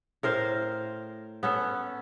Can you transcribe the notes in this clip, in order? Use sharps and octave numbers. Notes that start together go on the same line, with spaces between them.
A2 A#4 C5 F5
B3 C#4 A4